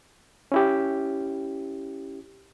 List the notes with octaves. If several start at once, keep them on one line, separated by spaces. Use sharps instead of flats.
C#4 E4 G4